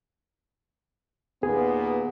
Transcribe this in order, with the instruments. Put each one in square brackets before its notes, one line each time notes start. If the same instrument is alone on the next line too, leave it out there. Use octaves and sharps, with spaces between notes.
[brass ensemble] D#2 A#2 B3 [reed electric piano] G#4